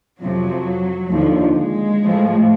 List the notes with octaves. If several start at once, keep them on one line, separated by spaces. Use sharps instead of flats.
F2 C3 F3 F#3
D#2 D3 F3
G#3
A2 F3